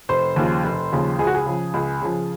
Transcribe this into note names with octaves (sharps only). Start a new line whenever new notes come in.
F1 C5
D#2 C#3 F3
F1
D#2 C#3 F3
C#2 G#4
F#4
G#4
C#3 F3
C#2
C#3 F3